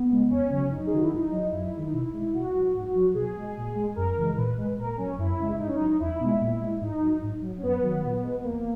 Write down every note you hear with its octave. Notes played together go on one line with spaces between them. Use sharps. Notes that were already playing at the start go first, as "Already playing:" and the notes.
Already playing: B3
C#3 G#3
E2 C#4
C#3 F#3
F#2 D#4
G#4
D#3 F#3 F#4
E4
G#2 D#4
F#3
F#2 E4
D#3 G#3
D#4
B2 E4
G#3
B2 F#4
F#3
G#2
F#3
B2 G#4
G#3
A#2
G#3
F#2 A#4
C#3 E3 G#3
A#2 B4
G#3
A#2 A#4
F#3 C#4
F#2 E4
C#3 G#3
G#2 D#4
C#4
F#3 D#4
E2 E4
B2 G#3
A#2
G#3
G#2 D#4
F#3
G#2
F#3
C#4
F#2 B3
D#3 F#3
A#2
G#3
B3
E2 A#3